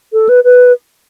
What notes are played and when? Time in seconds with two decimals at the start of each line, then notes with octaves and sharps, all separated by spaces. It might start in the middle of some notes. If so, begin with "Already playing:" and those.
0.13 A4
0.29 B4
0.44 B4